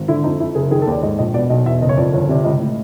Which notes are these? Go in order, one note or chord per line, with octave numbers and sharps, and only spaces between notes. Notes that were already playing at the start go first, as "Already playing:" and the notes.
Already playing: G#1
D3 E4
F2 D#4
F2 E4
F#1 G#4
D#3 G#4
A4
D#2 D5
G#2 D#5
A#1 D#5
B2 D5
B1 D#5
E2 E5
F#1 D#5
C#5
F2 D5
G1 C#5
C3 D5
C#2 D#5
A2